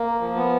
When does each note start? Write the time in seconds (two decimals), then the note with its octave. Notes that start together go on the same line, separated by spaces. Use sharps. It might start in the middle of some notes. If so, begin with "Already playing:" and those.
Already playing: A#3
0.21 F3
0.36 B3